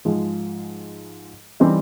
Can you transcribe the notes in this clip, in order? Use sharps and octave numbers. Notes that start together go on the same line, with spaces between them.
G#2 F3 G#3
E3 G3 C4 D#4